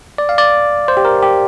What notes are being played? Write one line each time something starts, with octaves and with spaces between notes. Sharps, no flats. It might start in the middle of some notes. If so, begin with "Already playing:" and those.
D5
F5
D5
C5
G4
A#4
G4